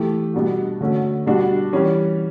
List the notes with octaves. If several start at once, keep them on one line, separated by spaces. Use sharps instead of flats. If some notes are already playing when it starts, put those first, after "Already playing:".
Already playing: E3 A3 E4 G4
B2 G3 D4 F#4
D3 A3 C#4 F#4
B2 G3 D4 F#4
E3 G3 C#4